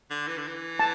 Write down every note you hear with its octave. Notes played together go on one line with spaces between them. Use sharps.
D3
E3
D3
E3
A5